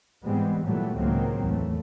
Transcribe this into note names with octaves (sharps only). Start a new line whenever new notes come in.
G#2 E3 G3 G#3 B3 C4
A#2 E3 F#3 G3 A3 B3
C#2 A2 D#3 F#3 A#3 C4
E2 A3